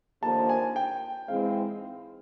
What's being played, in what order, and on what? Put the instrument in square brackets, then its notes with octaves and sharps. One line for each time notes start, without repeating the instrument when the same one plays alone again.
[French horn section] D#2 D3 F3 A#3 [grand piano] A5
[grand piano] G#5
G5
[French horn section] G#2 E3 G#3 C4 [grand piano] F5